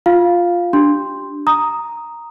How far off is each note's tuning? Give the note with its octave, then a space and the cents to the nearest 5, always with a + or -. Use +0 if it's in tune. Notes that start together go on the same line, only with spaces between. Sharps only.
F4 +5 F5 +0
D4 +0 G4 -20 C6 +0
A#5 +0 D#6 +0